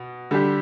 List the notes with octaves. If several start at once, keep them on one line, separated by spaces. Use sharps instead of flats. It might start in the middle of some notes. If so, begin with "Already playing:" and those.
Already playing: B2
D3 G3 D4 G4